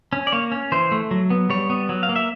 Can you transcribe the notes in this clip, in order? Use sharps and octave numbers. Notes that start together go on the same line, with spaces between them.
C#4
D5
A#3 C#5
C#4
E3 C5
A3
F#3
B3
G3 C#5
B3
F#3
F5
A#3
E5